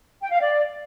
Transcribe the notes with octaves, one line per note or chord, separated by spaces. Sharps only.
G5
F5
D5